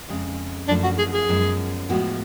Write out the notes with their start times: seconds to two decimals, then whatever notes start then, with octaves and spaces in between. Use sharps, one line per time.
0.09 F2 C#3 G#3
0.68 F#2 F3 A3 D4
0.84 F#4
0.99 G#4
1.14 G#4
1.29 F#2 F3 G#3 B3
1.89 A2 F3 G#3 B3 F#4